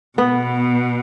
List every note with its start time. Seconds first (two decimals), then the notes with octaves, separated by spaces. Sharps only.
0.18 B2 B3